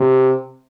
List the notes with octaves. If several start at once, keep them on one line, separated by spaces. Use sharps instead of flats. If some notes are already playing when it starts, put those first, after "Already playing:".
Already playing: C3